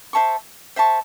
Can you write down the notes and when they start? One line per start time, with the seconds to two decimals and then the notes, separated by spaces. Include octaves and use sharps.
0.13 C5 E5 A5 C#6
0.76 C5 E5 A5 C#6